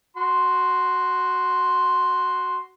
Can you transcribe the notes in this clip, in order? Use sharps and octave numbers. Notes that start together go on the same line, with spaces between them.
F#4 C6